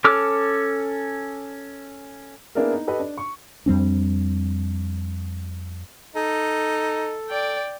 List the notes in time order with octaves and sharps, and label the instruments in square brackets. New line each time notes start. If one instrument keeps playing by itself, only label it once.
[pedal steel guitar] C#4 A4 D6 F6
[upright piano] A#3 B3 D4 E4 G#4 A#4
D#4
G4 A4 B4 D#5
D4
C#6
[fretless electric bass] F2 G3 C4 D4
[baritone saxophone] D#4 [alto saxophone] A4
[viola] D5 G5